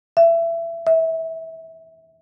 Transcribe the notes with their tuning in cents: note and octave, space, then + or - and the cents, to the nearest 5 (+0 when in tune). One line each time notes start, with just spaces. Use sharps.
E5 +25
E5 -25